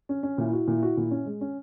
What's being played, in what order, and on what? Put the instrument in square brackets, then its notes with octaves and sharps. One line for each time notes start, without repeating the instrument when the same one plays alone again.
[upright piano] C#4
C#4
[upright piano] A#2 [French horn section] E4
[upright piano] F#4
A#2
F#4
A#2
C#4
G#3
C#4